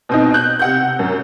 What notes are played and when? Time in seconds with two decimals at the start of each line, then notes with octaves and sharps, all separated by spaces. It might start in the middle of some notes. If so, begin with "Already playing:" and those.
0.09 B2 C4 D#4
0.34 F#6 G6
0.59 C3 F#5 G6
0.99 F#2